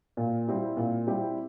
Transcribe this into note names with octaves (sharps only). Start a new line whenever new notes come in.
A#2
G3 C4 E4 G4
A#2
G3 C4 E4 G4